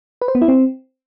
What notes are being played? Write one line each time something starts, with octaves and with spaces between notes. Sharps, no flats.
B4
C5
B3
E4
C4